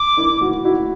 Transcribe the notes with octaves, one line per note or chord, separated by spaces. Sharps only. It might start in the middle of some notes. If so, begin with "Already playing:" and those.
Already playing: D6
D4 E4
E4 F#4
E4 F#4